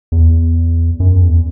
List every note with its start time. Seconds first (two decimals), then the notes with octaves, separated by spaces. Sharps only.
0.12 E2
1.00 F#2
1.22 E2